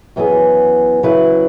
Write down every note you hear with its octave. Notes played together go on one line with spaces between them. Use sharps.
F#2 E3 B3 G#4
C#3 F#3 E4 B4